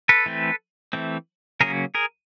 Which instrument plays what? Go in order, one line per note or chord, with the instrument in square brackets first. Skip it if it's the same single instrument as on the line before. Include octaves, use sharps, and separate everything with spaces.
[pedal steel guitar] A4 B4
E3 A3 C4
E3 A3 C4
C#3 F#3 A#3 C#4 G#4 A#4
G#4 A#4